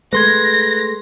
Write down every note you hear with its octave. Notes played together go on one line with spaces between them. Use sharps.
G#3 A3 B4 C6 G#6 A#6